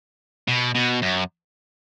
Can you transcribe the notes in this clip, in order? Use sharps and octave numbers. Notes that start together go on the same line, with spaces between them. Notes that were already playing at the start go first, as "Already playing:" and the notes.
B2
B2
F#2